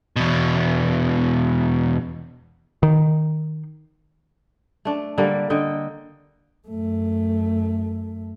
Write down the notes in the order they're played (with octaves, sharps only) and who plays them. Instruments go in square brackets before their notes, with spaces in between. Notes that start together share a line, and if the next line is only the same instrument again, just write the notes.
[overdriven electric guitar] E2 B2
[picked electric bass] D#3
[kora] A3 D4
D3 G3 A#3
D3 D#5 G5
[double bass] F#2 A3